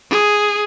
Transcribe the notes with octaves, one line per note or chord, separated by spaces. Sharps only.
G#4